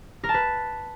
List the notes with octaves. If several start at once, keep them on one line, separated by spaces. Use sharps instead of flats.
A#4
A5
B4